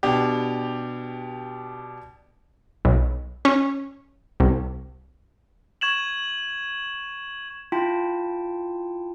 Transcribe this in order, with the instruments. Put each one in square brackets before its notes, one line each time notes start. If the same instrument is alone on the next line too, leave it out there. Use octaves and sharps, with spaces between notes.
[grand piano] B2 D4 G4
[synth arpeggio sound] B1
C#4
C2
[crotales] C#6 G#6 E7 F#7
[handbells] E4 F4 G5 A5